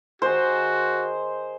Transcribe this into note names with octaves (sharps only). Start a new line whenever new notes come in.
D#3 F#4 G#4 C5